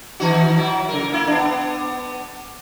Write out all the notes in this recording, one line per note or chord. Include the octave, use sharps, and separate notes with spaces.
D#3 D#4 F#4
F#3 E4
C#3 A#4
A#3 E4
B3 D4